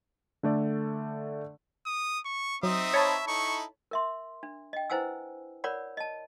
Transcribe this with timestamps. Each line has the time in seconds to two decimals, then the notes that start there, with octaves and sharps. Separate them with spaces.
0.43 D3 A3 D5
1.86 D#6
2.25 C#6
2.63 F#3 C4 D#4 E5 D#6
2.94 C#5 A5 B5
3.27 D#4 E4 A4 C#6
3.91 A#4 E5 C6
4.43 D4
4.73 D#5 G5
4.90 E4 B4 C5 F#5 G#5 E6
5.64 A#4 C#5 D5 F#5 B5
5.97 D#5 A5